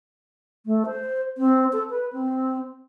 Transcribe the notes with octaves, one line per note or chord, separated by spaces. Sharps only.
A3
C5
C4
A4
B4
C4